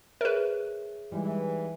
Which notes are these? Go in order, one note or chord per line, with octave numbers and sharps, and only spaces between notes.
G#4 A#4 B4 C#5 E5
E3 G3 G#3 D#4